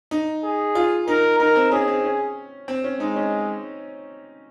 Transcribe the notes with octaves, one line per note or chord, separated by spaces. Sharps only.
D#4
G#4
F4
D#4 A#4
D#4 A#4
C4
C#4 G#4
C4
C#4
C4
C#4
G#3 D#4
C#4